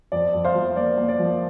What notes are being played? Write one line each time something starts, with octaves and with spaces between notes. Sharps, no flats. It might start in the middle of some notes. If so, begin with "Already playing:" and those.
F2 D5
F2
C5 F5
F3
A#3 D5
A#3
D5
F3